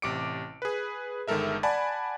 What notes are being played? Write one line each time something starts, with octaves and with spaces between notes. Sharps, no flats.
A1 C3 D6 C#7 D7
G#4 B4
G1 D#3 G#3 A4 A#4 E5
D5 F#5 G#5 A5 B5